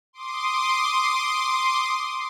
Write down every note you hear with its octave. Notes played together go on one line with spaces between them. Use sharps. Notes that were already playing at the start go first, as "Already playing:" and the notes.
C6 D6 D#6